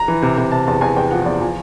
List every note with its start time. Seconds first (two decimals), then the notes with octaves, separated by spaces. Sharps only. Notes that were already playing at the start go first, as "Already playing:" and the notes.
Already playing: A#5
0.08 E3
0.22 C3
0.37 C3
0.52 C3 A5
0.67 E2 A5
0.81 E2 G#5
0.96 E2 G5
1.11 F3 F#5
1.26 E2 D5
1.41 F3 G#5